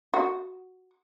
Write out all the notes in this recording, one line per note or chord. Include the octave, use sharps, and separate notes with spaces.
F#4